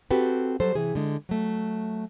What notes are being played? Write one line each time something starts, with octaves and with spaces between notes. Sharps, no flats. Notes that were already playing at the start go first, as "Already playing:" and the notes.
C4 F#4 G4 A4 B4
F#3 G3 A4 C5
C3 E3 G#4
D3 G#3
F#3 A3